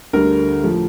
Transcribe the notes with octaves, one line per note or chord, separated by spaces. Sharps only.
D2 D3 G3 A#4
A2 F3 A3